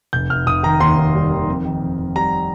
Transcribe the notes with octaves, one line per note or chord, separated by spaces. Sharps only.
F1 G6
F1 F6
F1 D#6
D#3 A#5
D#2 C6
D#2
G3
D#3
F2
D#3
F2
F2
G3 A#5